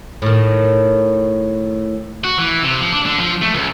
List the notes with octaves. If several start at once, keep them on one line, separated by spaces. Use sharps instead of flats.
A2 D#3
F#4
E3
C3
F3
D4
D3
F3
A3
C#2